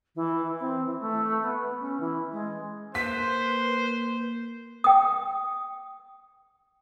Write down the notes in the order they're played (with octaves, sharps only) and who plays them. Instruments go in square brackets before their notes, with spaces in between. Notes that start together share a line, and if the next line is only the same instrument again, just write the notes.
[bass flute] E3
C4
E3
A3
B3
C#4
E3
G#3
[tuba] A#3 [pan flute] B4 [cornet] C5 [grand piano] B6
[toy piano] G5 D#6